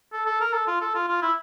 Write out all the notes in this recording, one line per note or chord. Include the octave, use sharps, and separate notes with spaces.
A4
A4
A#4
A4
F4
A4
F4
F4
E4